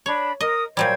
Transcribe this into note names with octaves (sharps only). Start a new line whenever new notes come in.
D4 C#5 B5
A#4 D#5 D#6
A#2 F#3 G3 C5 G5 G#6